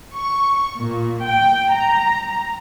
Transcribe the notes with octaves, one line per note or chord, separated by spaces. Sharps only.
C#6
A#2
G5
A#5